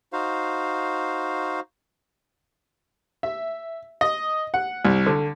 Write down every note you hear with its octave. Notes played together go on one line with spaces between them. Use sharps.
D#4 F#4 C5 F5
E5
D#5
F#5
C2
D3